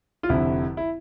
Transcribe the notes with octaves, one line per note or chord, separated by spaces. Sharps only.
F4
F1 F2 D3 E4
E4